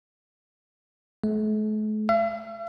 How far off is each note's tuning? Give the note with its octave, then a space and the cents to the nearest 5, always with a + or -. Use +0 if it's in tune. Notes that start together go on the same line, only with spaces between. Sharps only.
A3 -45
E5 +45